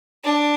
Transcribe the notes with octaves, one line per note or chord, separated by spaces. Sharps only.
D4